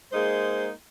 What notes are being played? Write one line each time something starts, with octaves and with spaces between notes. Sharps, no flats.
G#3 A#3 D#4 G#4 C5